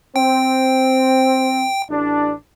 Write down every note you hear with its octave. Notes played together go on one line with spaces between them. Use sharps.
C4 G5
A1 D4